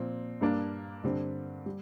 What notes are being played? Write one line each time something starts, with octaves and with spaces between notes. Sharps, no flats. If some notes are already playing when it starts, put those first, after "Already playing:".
Already playing: A#2 F3 C4
G2 G3 A#3 D4 A#4
G2 D3 G3 C4
G3